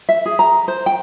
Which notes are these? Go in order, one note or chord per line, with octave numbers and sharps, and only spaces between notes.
E5
G#4
A#5
C5
G5